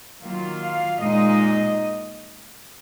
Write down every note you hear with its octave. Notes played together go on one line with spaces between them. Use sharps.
D#3 F#3 A#3 F4
F5
A#2 G#3 D#4 D#5